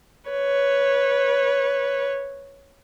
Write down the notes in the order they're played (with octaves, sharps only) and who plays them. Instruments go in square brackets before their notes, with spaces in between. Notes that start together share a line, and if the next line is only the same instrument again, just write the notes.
[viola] B4 C#5